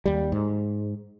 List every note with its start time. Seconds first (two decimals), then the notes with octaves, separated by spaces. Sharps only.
0.06 D#2 G3
0.32 G#2